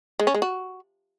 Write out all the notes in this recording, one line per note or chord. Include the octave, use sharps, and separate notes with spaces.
G#3
C#4
G#3
F#4